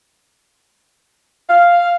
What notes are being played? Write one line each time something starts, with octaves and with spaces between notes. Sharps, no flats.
F5